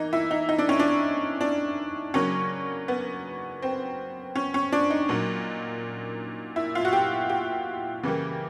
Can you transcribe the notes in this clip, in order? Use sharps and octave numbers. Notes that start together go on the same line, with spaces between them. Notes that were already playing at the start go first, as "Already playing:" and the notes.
Already playing: E3 A#3 D#4
E4
D#4
D#4
D4
C#4
D4
D4
C#3 F#3 A#3 C#4
B3
C4
C#4
C#4
D4
D#4
A#2 F#3 A#3
E4
F4
F#4
G4
G4
C#3 E3 G3 A#3